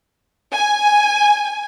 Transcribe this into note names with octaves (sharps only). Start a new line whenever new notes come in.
G#5